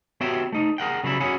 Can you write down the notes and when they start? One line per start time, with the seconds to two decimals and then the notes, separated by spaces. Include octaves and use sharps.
0.21 B3 F#4 G4 C#5 E5 G5
0.52 A3 D#4
0.78 G#4 A#4 F#5 G5
1.04 C#3 F#3 G3 E4
1.20 C#4 E4 F#4 G#4 C#5